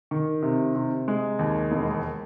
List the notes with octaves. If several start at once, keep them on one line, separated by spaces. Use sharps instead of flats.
D#3
C3
C3
G#3
D#2
E1